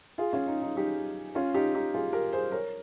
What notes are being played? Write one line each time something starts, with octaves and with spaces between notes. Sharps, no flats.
F4 G#4
C#4 F4
D#4
D#4
D#4 G4
C#4 F4
D#4 G4
D#4 G4
F4 G#4
G4 A#4
G#4 C5
A#4 C#5